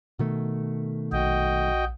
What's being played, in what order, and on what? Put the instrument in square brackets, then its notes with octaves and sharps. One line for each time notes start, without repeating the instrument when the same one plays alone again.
[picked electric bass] B2 D#3 A3
[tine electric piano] A#1 [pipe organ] F#4 D#5 G5